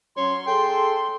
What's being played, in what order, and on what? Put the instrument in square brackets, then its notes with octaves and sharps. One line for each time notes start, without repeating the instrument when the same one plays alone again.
[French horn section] F#3 C#4 [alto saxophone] C#5 [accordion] C6
[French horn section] G#4 A4 [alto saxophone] G5